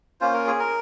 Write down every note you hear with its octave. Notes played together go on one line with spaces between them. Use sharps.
A#3 C#4 F4 C5
A#4
G#4
A#4